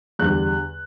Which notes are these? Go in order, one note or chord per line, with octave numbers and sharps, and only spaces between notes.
E2 D3 G3 F#6